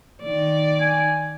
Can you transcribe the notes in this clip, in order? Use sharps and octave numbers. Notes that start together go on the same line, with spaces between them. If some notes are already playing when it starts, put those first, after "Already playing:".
D#3 D5
G#5